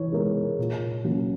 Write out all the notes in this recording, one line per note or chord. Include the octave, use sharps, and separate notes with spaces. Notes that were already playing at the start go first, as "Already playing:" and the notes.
Already playing: E3 D#4 C#5
G#3 B3 D#4 A#4
A#2
F#3 A#3 C#4